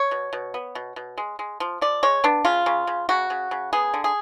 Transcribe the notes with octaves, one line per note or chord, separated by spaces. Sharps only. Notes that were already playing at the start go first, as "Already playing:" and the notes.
Already playing: C#5
B2
B2
B3
B2
B2
G#3
G#3
F3
F3 D5
G#3 C#5
B3 D4
C#3 F4
C#3
C#3
C#3 F#4
C#3
C#3
B3 G#4
D3
G#4